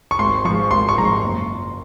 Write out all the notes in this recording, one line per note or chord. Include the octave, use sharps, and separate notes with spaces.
C#6
G#1 C6
G#2 F3 C#6
G#1 C6
C#6
G#2 F3 A#5
C6
F#1